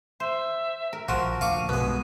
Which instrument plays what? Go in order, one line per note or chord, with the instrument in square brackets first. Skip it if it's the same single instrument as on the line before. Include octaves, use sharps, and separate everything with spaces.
[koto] C5 [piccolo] E5
[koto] A#4
[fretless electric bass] A#1 [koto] F3 A#4 [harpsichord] F#4
[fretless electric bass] D2 A#2 D3 [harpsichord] F5 C#6 D6 [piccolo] D#7
[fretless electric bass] B1 G2 [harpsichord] B2 G#3 [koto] B3